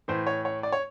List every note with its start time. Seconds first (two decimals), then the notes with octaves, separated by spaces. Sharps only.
0.08 A2 E3 C5
0.27 C#5
0.45 C#5
0.63 D5
0.72 C#5